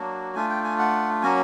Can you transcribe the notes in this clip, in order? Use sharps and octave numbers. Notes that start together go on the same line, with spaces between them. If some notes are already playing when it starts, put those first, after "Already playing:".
Already playing: F#3 A#3 D4 F#4
A3 D4 F4 G#5
G5
G#5
F#5
F#3 A#3 C#4 F#4 G#5